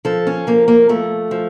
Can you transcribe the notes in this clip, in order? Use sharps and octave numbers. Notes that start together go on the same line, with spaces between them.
F3 A4
C#4
F3 A#3
A#3
F3 A3
F3